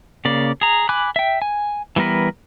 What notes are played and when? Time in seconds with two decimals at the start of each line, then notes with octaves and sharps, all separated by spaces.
0.25 C#3 A#3 D5
0.61 G#4 A#5
0.89 G#5 B5 D6 F#6
1.16 E5 G5
1.42 G#5
1.96 E3 G3 B3 A#4 B4